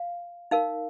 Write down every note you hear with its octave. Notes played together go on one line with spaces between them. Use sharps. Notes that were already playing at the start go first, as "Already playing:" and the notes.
Already playing: F5
D#4 A#4 F5